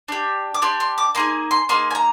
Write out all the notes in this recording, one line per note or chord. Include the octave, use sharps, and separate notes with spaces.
D4 G4
D6
D4 G4 C6
C6
D6
A#3 D#4 G#4 C6
C6
A#3 D#4 G#4 C6
G#5
A#5